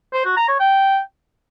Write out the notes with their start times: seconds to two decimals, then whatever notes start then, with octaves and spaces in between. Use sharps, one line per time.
0.13 C5
0.25 F#4
0.37 A#5
0.48 C#5
0.60 G5